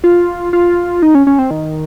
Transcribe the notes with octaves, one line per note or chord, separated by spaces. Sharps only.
F4
F4
D#4
C#4
C#4
C4
D#3